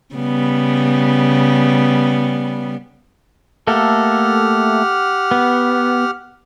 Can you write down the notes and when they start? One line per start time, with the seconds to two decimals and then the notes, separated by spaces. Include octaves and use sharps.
0.15 C#3 G3 B3
3.67 A3 A#3 G4 A4 F#5 F6
5.31 B3